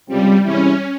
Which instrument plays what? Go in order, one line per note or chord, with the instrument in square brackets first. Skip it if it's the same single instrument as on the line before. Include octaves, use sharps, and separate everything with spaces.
[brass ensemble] C#2 C3 F3 C4 [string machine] G3
[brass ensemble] C3 E3 G#3 E4 [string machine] C#4